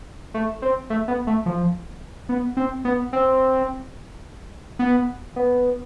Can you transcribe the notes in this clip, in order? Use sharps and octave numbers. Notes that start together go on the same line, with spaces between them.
A3
C4
A3
B3
A3
F3
B3
C4
B3
C4
B3
B3